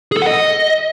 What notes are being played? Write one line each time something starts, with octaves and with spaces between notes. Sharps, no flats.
G#4
A4
F#5
D#5